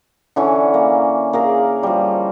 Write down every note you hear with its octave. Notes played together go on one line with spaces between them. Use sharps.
D3 E3 C#4
A#3
A#3 G#4 A#4
F3 G3